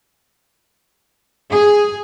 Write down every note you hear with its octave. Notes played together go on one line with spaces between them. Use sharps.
G#4